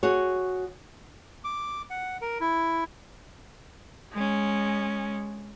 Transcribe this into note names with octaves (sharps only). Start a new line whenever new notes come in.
F#4 G#4 C#5
D6
F#5
A#4
E4
G#3 C#4